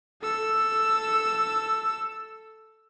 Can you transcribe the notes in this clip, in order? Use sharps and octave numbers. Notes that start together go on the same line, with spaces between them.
A4 E6